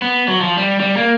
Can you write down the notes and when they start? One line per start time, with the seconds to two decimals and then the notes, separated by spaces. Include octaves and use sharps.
0.02 B3
0.28 F#3
0.41 F3
0.57 G3
0.80 G3
0.97 A#3